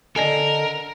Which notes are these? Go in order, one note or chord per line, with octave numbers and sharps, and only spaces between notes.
D3 A4 A#4 D5 D#5 G#5